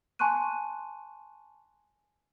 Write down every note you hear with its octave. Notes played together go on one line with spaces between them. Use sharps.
G#5 A5 C6 C#6 F#6 D#7